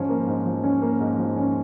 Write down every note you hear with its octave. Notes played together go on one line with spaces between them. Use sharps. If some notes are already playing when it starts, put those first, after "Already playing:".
Already playing: G#2 F3 C#4
A#3
G#2
F3
C#4
A#3
G#2
F3
C#4